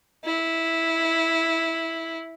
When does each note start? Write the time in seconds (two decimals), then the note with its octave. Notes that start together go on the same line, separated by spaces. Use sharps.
0.24 E4